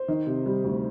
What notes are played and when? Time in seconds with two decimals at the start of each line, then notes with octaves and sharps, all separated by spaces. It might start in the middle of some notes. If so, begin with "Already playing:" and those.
Already playing: C5
0.08 D#3
0.27 C3
0.46 G3
0.64 D2